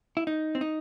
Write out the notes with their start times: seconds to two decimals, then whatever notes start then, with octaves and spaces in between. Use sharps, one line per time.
0.17 E4
0.27 D#4
0.55 C4
0.61 D#4